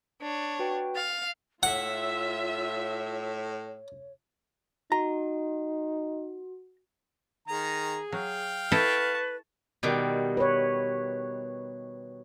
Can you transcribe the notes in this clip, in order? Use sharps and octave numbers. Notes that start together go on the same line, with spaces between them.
D4 C#5
F#4 B4 G5
F5 A6
A2 F4 C#5 E5 F#5
D#4 F#4 A#5
D#3 G#4 A#5
F#3 F5 G5
E4 A4 B4 D#5 A5 C#6
B2 D#3 G3
B4 C#5